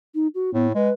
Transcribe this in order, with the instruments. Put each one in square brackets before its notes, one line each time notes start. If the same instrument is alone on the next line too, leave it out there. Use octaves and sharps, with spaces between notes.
[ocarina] D#4
F#4
[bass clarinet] A2 [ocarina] B3
[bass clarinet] G#3 [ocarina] B4